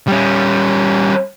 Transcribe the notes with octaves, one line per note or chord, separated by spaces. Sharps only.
G3 C#4